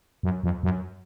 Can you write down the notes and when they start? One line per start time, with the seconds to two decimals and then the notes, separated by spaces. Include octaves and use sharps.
0.23 F#2
0.43 F2
0.63 F#2